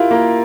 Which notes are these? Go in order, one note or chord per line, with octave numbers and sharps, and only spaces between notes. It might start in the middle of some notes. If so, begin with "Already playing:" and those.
Already playing: E4 F4 G4 A#4
A#3